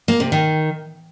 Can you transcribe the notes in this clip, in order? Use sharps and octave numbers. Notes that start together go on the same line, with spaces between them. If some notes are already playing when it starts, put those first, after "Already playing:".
A#3
C3
D#3